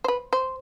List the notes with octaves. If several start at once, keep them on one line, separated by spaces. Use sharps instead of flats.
C5
B4
C5